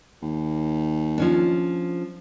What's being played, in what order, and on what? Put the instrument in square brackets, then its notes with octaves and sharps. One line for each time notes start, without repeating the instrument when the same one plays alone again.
[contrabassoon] D#2
[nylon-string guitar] F3 C#4 D4